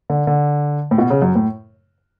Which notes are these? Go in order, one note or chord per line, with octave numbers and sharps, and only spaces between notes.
D3
D3
A2
B2
C#3
F#2
A2